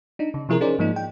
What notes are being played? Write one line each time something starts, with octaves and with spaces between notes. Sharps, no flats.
D4 D#4
C#3
C3 F3 E4 G#4 A#4
C#4 D#4 G#4 A#4 C5 D5
G#2 F3 A#3 D#4
G5